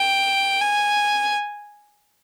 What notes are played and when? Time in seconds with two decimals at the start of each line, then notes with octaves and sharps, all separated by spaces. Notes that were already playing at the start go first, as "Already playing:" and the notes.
Already playing: G5
0.61 G#5